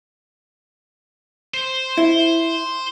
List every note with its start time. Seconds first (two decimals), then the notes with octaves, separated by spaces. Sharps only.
1.54 C5
1.97 E4